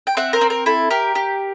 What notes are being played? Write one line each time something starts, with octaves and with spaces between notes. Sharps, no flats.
G5
C4 E5 F#5
A#4 C5
C4
A#4
E4 A4
G4 A#4
G4